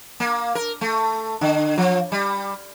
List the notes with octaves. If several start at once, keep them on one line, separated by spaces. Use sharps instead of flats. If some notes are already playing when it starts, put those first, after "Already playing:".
A#3
A#4
A3
D3
F3
G3